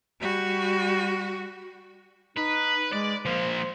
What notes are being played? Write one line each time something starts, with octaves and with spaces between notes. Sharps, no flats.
G3 F#4
D#4 B4
G#3 D5
F3 A#3 C5